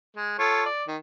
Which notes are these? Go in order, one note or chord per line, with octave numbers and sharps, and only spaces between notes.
G#3
F4 A4 C#5
D5
D#3